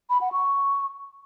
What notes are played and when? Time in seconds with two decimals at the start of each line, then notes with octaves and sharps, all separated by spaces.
0.10 B5
0.21 F#5
0.32 C#6